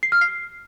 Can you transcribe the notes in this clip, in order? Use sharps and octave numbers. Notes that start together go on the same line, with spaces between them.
C7
F6
C7